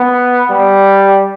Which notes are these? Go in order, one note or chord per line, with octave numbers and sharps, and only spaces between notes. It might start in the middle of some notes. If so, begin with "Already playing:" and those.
Already playing: B3
G3